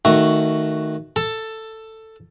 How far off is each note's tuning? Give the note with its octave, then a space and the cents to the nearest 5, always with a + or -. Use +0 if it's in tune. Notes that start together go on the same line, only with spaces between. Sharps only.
D#3 +0 A3 +10 F#4 +0
A4 +10 A5 +10